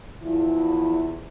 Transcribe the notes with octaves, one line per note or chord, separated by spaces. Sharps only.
E2 F3 E4